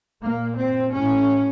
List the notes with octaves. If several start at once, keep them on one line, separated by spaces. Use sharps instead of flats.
A#2 A#3
C4
A2 C#4